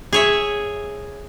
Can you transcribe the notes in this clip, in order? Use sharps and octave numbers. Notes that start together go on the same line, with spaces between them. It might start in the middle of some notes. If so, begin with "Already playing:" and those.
G#4 C#5 E5